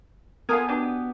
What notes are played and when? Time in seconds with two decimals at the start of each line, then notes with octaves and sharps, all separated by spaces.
0.49 B3 F4 A4 A#4 G#5 D#6
0.69 B2 D4 G4